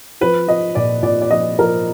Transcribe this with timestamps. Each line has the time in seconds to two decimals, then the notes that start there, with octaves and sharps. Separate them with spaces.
0.21 F3 B4
0.48 F3 D#5
0.75 A#2 D5
1.03 A#2 D5
1.21 D5
1.30 F3 D#5
1.59 F3 A#4